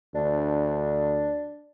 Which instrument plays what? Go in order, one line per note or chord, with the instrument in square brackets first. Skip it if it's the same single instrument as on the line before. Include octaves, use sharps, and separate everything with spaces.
[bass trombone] D2 [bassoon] D4